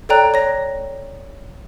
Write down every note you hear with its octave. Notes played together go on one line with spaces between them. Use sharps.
A4 C#5 D5 G5 A#5 F#6
C#5 A#6